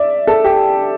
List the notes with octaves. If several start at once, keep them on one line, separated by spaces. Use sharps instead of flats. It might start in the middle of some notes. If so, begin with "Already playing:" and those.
Already playing: D5 E5
A4
G4